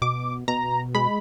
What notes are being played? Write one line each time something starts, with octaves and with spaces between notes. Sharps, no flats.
B2 D6
B2 A#5
G#3 B5